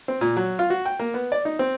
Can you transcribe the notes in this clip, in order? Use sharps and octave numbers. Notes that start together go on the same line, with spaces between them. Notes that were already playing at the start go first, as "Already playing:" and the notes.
C4
A#2
F#3
F4
F#4
G5
A#3
B3
D5
D#4
C4